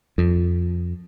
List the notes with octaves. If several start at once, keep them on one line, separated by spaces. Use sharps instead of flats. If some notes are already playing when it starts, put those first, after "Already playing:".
F2